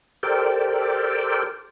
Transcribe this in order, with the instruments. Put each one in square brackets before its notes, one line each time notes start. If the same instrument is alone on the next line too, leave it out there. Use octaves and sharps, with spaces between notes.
[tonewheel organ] G4 A4 A#4 C5 D5 G5